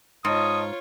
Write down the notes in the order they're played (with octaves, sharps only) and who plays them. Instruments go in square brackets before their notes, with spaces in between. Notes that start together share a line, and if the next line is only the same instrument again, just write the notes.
[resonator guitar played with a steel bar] G#2 [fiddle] F4 C#5 [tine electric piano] D#5 A5 C6 [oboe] D#6